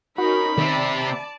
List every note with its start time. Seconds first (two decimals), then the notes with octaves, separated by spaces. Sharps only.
0.18 C#4 D#4 F#4 A#4 B5
0.58 C3 D#3 C4 D5 A5